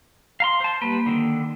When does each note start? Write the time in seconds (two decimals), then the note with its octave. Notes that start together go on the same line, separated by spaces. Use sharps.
0.40 F5 A#5 C6
0.60 C5 A5
0.82 G3 A#3 B4
1.06 D3 D#3